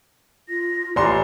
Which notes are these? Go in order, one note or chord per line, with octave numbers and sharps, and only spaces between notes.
F4 A#6
A1 G4 D5 A#5 C6